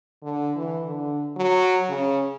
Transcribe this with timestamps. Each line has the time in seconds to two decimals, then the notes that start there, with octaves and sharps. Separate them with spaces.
0.23 D3
0.56 E3
0.85 D3
1.37 F#3
1.89 C#3